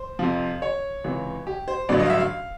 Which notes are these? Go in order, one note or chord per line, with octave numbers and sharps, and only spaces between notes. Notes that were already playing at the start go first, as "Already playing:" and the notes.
Already playing: C5
F2 C3 F3
C#5
C#2 C3 E3
G4
C5
A1 G2 D3 F#3 D5
D#5
F5
E5
F5